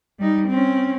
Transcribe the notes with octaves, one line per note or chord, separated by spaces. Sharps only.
G3 D#4
C4 C#4